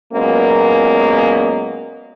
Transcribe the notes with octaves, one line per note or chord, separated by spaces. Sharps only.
A#2 F#3 G#3 A#3 B3 C#4